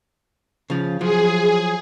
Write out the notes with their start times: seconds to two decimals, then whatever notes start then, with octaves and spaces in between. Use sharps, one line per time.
0.70 C#3 F3
1.01 F3 F#3 G#4